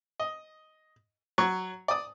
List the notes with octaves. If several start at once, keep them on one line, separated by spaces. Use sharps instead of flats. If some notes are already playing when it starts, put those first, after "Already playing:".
D#5
F#3 C#6
D5 D#6